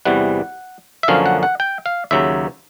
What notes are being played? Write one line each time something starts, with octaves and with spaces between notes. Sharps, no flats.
E2 C3 E3 G3 F#5
E5
F#2 D3 F3 A#3 C#4 F5
F#5
F#5
G5
F5
D#2 C#3 F#3 E5